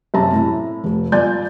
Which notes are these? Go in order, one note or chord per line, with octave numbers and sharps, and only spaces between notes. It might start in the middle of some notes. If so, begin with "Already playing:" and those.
F#2 C3 E5 A5 A#5
A2 E4
F1
G1 F4 D5 G#5 G6 A6